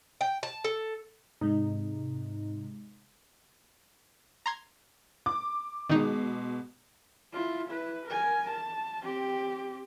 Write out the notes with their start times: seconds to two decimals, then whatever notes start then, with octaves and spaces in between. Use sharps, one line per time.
0.21 G5
0.43 A5
0.64 A4
1.41 G#2 C3 G#3 D#4
4.46 A#5 C6 G#6
5.26 D6
5.89 B2 D#3 G#3 D#4
7.33 E4 F4
7.68 E4 B4
8.07 A#4 G#5
8.50 A5
9.04 C4 G4